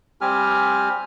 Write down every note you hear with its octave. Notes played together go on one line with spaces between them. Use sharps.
G3 C4 G4 G#5 F6